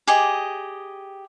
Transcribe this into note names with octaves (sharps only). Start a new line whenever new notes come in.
G4 G#4 D#5